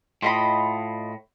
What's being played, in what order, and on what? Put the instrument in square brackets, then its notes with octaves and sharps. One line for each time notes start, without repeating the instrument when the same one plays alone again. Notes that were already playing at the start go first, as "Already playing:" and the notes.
[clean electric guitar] A2 [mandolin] F4 D#5 B5